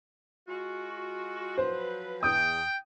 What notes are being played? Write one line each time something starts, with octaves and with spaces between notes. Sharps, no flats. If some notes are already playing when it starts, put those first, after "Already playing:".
G#3 F4 F#4
F3 F#3 B4 C5
E2 G5 D#6